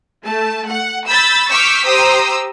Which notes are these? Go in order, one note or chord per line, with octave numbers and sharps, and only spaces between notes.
A3 A5
F#5
B5 E6 G6 A6
C#6 D6 E6 F6 G6 B6
G4 C5 A#5 D#6 E6